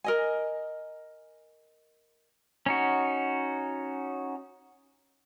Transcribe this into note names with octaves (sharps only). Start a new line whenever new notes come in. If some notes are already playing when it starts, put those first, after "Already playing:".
A#4 D#5 G#5
C#4 D#4 F#4